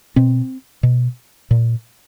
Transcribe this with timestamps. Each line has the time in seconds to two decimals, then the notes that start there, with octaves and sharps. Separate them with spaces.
0.16 B2 C4
0.83 B2
1.51 A#2